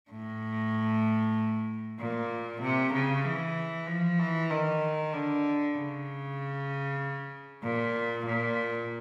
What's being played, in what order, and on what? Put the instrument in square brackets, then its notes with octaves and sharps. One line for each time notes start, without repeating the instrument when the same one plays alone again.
[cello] A2
A#2
C3
C#3
E3
F3
E3
D#3
D3
C#3
A#2
A#2